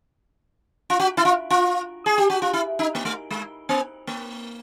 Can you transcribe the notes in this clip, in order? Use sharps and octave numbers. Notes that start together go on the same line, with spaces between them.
F4
F#4
E4
F4
F4
G#4
G4
F#4
F4
E4
D#4
A#3
A3
G#3
B3
A#3